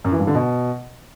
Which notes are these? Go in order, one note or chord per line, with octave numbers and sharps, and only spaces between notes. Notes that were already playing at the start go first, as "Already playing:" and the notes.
F#2
E3
G2
D3
B2